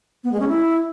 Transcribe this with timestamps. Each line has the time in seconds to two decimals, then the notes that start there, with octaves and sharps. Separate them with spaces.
0.24 B3
0.32 G#3
0.40 C#4
0.48 E4